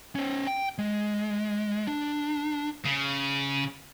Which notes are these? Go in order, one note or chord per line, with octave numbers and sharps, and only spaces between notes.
C#4 C5
G5
G#3
D4
C#3